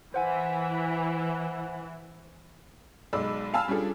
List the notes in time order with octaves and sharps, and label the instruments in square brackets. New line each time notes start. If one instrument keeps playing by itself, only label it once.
[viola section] E3 [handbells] C5 F#5 G#5
[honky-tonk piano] B1 G#3 D5 B5 E6
F5 G#5 A5 B5 E6 F6
G3 C#4 D4 F4 G#4 A4